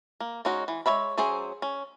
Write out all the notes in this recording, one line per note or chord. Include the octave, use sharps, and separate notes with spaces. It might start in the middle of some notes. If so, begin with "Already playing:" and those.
A#3
G#3 C#4 D#4 F#4
E3
G#3 B4 C#5 E5 B5
F#3 C#4 G#4 C5 E5
C#4